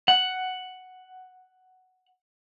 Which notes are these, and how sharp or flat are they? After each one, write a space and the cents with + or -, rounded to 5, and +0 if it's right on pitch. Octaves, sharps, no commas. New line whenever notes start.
F#5 +5